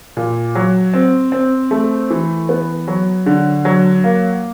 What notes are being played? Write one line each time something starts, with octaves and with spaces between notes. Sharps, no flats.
A#2
F#3
C4
C4
A3
E3
B3
F#3
D3
F#3
A#3